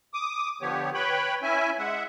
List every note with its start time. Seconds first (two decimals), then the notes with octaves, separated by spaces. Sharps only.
0.14 D6 D#6
0.62 D3 F3 B3 G4 C#5
0.94 B4 C#5 G5 B5
1.43 C#4 E4 E5 G#5
1.78 G#3 E5 F#5